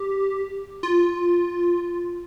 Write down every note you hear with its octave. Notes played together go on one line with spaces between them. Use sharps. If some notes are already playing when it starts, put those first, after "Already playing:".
Already playing: G4
F4